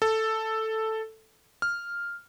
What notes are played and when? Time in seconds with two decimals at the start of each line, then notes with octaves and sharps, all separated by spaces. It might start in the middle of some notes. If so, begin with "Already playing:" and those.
0.02 A4
1.62 F6